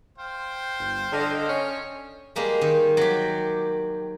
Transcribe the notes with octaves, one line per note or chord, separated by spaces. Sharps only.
C5 F5 G5
G1
D3 D4 D#5 F6
C#4
G3 G#3 A#3
D#3
F#3 G4